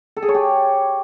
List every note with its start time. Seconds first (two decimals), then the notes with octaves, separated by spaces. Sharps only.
0.17 A4
0.22 G#4
0.28 C#5
0.34 G4